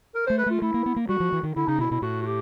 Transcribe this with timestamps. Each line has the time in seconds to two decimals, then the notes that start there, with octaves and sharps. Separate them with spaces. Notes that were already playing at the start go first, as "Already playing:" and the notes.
0.15 A#4
0.26 C5
0.30 A3
0.38 B4
0.46 A3 F4
0.62 A3 E4
0.74 A#3
0.86 B3
0.96 A#3
1.09 G3 F#4
1.20 F3
1.32 E3
1.43 D#3
1.56 D3 E4
1.67 C#3 D#4
1.78 B2 E4
1.90 B2 E4
2.02 A2 F#4
2.22 F#4
2.26 G4